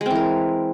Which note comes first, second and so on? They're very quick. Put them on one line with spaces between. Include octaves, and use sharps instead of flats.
G#3 C4 E3 A#4